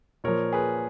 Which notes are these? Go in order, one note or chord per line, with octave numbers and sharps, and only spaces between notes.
A#2 F3 A#4 C#5
G#4 B4